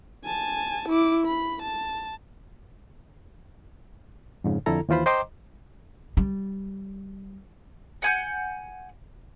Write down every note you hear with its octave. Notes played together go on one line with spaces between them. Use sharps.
G#5 A5
E4 D6
B5
A5
F2 G#2 C#3
F2 D3 E4 A4 A#5
D#2 E3 F4 C5 B5
C5 D#5 G5 A#5 C6 D6
G3
F#5 G#5 G6